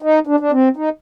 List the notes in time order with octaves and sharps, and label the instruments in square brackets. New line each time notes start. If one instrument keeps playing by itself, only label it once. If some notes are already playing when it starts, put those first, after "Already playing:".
[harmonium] D#4
D4
D4
C4
D#4